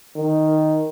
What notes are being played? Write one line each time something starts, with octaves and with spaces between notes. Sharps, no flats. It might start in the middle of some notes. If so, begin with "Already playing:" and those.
D#3